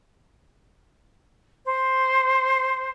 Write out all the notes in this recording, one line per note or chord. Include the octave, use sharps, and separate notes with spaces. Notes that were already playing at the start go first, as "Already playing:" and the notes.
C5